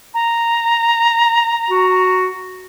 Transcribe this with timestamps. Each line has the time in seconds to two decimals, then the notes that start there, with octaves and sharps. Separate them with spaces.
0.14 A#5
1.70 F#4